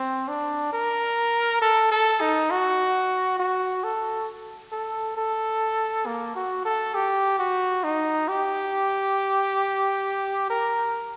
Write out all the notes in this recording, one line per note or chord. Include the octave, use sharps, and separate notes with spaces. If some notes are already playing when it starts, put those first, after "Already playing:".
Already playing: C4
D4
A#4
A4
A4
D#4
F#4
F#4
A4
A4
A4
A#3
F#4
A4
G4
F#4
D#4
G4
A#4